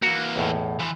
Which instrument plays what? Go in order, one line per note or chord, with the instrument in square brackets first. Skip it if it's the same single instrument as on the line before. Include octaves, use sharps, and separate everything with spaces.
[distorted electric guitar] E3 A#3 [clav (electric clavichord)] F#4
[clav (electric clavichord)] B1 E2 A2
[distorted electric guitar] E3 F3